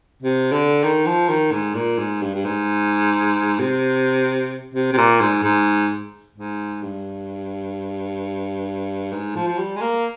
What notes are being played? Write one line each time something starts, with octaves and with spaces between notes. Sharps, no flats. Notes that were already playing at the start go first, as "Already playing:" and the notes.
C3
D3
D#3
F3
D#3
G#2
A#2
G#2
G2
G2
G#2
C3
C3
C3
A#2
G#2
G#2
G#2
G2
G#2
F3
F3
G3
G#3
A#3